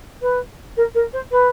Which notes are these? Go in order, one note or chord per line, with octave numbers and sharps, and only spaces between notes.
B4
A#4
A#4
C5
B4